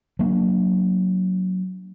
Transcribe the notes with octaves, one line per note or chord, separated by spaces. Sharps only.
F#3 A#3 C#4 D4